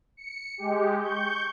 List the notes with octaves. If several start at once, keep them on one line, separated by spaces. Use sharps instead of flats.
C#7
G#3 G4
C#6 G6